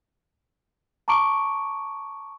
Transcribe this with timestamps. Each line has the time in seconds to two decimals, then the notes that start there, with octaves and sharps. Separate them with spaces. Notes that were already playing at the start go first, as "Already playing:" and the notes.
1.08 A5 A#5 C#6 D6 D7